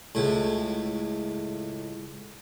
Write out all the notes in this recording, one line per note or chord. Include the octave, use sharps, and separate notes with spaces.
C#2 A2